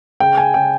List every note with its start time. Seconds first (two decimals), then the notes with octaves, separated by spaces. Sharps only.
0.20 C#3 G5
0.37 G#5
0.54 C#3 G5